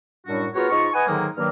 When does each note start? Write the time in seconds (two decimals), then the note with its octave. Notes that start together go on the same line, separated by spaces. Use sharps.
0.26 F#2 A2 G3 D4 F#4
0.54 B3 F4 F#4 G#4 A#4 C#5
0.70 G#2 F4 D#5 C#6
0.94 B4 D#5 F#5 G#5
1.07 G#2 D3 D#3 F#3 G#3 A#3
1.37 G2 D#3 F#3 A#3 F6